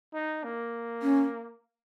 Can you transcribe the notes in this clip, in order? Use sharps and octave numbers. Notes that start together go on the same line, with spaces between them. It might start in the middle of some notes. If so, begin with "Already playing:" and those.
D#4
A#3
C#4